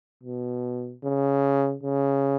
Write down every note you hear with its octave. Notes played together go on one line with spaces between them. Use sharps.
B2
C#3
C#3